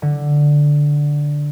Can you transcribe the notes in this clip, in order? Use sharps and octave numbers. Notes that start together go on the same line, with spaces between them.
D3